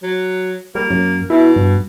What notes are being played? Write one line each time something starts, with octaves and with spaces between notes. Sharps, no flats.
F#3
G3 A#3
F#2
B2 E4
G2